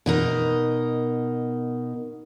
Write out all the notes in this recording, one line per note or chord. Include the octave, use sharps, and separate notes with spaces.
B2 D#4 A#4